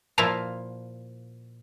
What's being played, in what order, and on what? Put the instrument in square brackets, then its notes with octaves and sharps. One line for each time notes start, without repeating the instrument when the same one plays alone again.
[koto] A#2 F3 E4 F4 A#4 F5